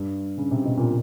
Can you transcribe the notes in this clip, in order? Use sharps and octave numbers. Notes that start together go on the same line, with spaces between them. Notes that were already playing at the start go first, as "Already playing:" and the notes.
Already playing: G2
C#3
C3
B2
A#2